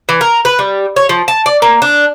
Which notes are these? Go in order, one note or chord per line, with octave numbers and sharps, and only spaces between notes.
E3
A#4
B4
G3
C#5
F3
A5
D5
A#3
D4